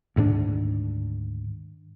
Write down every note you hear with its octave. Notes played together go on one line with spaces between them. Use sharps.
D2 G#2 D#3 D4